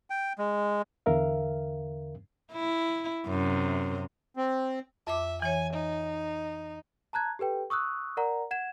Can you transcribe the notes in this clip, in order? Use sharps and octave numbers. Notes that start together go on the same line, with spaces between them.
G5
G#3
E2 D3 A#4 E5 F5
E4
F#2 C3
C4
F2 E5 D6
E3 C#5 G#5
D#4
A5 A#5 F#6 G#6
G4 A4 B4 G5
C#6 D#6 E6 F#6
A#4 D5 F#5 A#5
F#5 G#6 E7